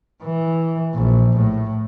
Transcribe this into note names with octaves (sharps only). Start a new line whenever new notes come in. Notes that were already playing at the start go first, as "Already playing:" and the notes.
E3
A#1
A2